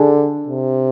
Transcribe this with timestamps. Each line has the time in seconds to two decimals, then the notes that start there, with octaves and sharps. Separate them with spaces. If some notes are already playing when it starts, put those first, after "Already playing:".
Already playing: D3 D4 G#4
0.47 C3